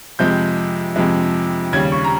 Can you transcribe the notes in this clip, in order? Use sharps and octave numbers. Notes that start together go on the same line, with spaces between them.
F2 C3 F3 G#3 G6
F2 C3 F3 G#3
D#2 C#3 G3 G#6
C#6
A#5